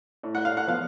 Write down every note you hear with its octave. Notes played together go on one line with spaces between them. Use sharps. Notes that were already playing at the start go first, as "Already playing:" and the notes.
A2
F#5
F5
F#5
F3 B3 F5